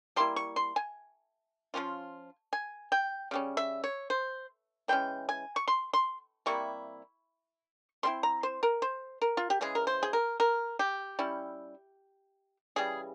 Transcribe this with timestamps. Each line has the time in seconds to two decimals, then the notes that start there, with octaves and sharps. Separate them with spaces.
0.16 G3 A#3 E4 C6
0.36 C#6
0.56 C6
0.76 G#5
1.74 F3 G#3 C#4 F4
2.53 G#5
2.92 G5
3.31 C#3 G3 C#4
3.57 E5
3.84 C#5
4.10 C5
4.88 E3 G#3 C#4 G5
5.29 G#5
5.56 C#6
5.68 C6
5.93 C6
6.46 C3 G3 A#3 E4 C#6
8.03 G3 C4 E4 C6
8.23 A#5
8.43 C5
8.63 A#4
8.82 C5
9.22 A#4
9.37 F4
9.50 G4
9.61 C#3 E3 G#3 G#4
9.75 A#4
9.87 C5
10.03 G#4
10.13 A#4
10.40 A#4
10.79 G4
11.19 G3 C#4 E4
12.76 C#3 E3 G3 G#4